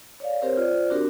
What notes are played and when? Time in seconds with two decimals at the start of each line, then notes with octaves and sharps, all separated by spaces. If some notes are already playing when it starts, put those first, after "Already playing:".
0.20 C#5 D5 F5
0.42 C4 G4 A#4 C5 C#5
0.57 F4 C5 D5
0.90 C4 D4 F#4 G4 A#4